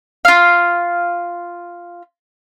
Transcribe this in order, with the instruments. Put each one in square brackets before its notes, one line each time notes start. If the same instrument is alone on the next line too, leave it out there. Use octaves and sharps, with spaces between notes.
[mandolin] F4 F5